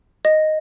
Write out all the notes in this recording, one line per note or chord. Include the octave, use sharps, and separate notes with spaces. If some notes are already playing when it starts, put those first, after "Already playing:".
D#5